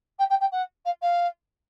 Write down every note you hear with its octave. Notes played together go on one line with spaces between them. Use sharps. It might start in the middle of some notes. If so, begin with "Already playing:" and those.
G5
G5
G5
F#5
F5
F5